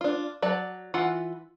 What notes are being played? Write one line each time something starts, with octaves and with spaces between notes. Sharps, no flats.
D4 F4
F#3 D5 A5
E3 F4 F#5